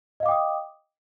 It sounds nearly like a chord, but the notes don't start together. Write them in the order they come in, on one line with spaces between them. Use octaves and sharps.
D#5 F5 D6 G5 D#6